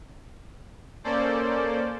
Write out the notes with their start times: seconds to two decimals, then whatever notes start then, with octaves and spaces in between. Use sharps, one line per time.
1.04 A#3 C#4 A4 C5 D5